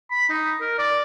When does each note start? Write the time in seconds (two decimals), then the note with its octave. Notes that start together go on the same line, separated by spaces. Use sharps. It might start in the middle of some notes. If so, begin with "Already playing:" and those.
0.11 B5
0.29 D#4
0.61 A#4
0.79 D5